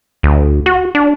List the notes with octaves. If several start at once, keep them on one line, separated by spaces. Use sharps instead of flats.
D2
F#4
D4